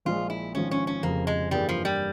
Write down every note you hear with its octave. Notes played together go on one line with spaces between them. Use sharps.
A#1 A#2 F3 G#3 F4
E4
G#1 G#2 F3 C#4
C#4
C#4
F1 F2 C#3 F3 A#3
G#3
G2 E3 G3 A#3 E4 G#4
F3
G3